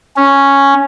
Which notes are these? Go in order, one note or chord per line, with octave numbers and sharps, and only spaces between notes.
C#4